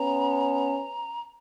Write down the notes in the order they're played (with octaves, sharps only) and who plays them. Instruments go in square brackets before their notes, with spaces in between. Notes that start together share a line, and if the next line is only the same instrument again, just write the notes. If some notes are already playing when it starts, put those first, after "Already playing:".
Already playing: [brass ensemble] B3 C#4 [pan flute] A#5